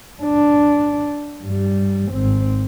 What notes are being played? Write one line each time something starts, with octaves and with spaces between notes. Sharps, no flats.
D4
G2 G3
G#1 C4